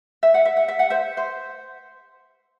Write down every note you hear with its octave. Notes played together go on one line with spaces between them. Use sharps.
E5
F#5
E5
F#5
E5
F#5
C5 E5
C5